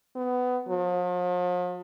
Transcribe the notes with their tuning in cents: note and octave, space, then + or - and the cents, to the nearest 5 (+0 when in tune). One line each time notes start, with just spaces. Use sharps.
B3 +20
F3 +45